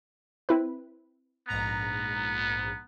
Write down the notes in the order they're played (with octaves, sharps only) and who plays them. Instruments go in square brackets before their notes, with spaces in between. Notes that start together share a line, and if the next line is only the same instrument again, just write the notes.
[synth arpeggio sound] C4 E4 B4
[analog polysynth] A#1 G#2 A#5 [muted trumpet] B3